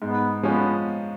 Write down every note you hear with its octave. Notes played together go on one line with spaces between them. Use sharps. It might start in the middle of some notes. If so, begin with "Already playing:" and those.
G#2 B3
F3 G#3 B3 C#4